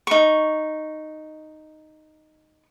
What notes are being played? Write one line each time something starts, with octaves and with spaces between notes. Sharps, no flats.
D#4 C#6